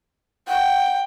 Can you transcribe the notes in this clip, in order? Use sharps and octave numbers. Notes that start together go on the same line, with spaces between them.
F#5 G5